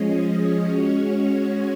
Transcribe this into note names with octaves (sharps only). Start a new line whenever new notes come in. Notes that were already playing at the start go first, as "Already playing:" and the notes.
Already playing: F3 G#3 C#4 G#4 D#5
G#3 C#4 F#4 C#5